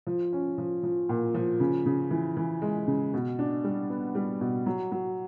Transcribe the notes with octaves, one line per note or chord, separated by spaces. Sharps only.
F3
C#4
F3
F3
A#2
F3
C#3
C#3
E3
E3
G#3
C#3
B2
D4
G3
B3
G3
B2
F#3
F#3